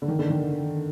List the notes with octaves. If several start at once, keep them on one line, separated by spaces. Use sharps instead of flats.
D3
D#3
D3
D#3